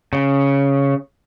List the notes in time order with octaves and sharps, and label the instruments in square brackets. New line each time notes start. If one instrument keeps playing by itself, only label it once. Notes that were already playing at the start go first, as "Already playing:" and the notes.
[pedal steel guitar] C#3